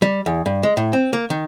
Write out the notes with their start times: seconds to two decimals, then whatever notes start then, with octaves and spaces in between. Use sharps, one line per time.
0.02 G3
0.26 E2
0.46 G2
0.63 G#3
0.77 A2
0.93 C4
1.13 A#3
1.30 D#3